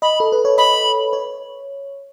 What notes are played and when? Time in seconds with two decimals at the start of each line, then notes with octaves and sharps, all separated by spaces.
0.02 D#5 B5
0.20 A4
0.32 B4
0.45 C#5
0.58 D#5 B5
1.13 C#5